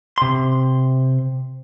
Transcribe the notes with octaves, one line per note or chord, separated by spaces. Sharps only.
C3 C6